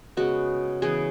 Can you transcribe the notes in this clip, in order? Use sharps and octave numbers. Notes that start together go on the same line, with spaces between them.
C#3 G#3 B3 F#4
C#3 E3 B3 G#4